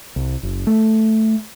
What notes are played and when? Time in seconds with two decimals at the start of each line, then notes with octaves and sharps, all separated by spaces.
0.16 C2
0.43 F#1
0.67 A3